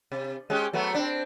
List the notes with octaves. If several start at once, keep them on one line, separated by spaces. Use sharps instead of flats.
C3
G#3 C#4 G4
F#3 A3 B3
C4 D4